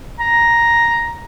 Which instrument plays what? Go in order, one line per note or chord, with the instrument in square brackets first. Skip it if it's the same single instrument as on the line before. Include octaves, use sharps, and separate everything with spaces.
[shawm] A#5